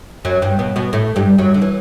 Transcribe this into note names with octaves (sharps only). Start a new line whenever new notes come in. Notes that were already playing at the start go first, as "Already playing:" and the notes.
F#2 F#3
G2 G3
B2 B3
B2 B3
A2 A3
G2 G3
F#2 F#3
D3
E3